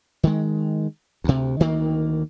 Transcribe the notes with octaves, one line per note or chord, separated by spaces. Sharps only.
D#3 G#3
D2 C3
D2 D#3 A#3